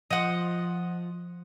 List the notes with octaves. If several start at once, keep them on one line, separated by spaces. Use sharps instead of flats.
F3 D#5 F#5